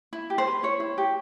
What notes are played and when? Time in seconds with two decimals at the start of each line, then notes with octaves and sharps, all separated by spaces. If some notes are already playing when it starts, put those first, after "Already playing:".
0.13 E4
0.30 G4
0.38 C5
0.47 B4
0.63 E4 C#5
0.80 E4
0.98 G4